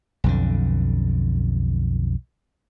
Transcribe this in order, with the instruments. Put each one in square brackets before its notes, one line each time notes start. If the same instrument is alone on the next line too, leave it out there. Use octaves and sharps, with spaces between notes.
[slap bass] B1 F2 D3